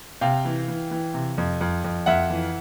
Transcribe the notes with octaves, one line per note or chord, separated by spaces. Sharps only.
C3 F5 G5
E3
E3
E3
C3
F2
F2
F2
F2 E5 F#5
E3